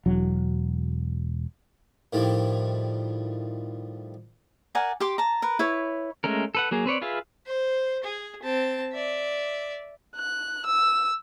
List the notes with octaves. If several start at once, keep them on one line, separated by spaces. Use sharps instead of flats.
E1 F#3
A2 D#3 F3 G3
A#4 D5 F#5 G#5
G4 C6 D6
A5 A#5
A#4 B4
E4 B4 C#5
G#3 A3 C#4 A#4
A4 B4 F#5
F#3 A#3 G#4
C4 B4 C#5 D5
F4 G#4 B4 E5 F5
C5
G#4
C4 A5
D5 E5
F#6
E6